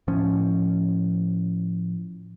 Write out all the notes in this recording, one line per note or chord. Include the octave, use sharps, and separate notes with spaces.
A2 F3 C#4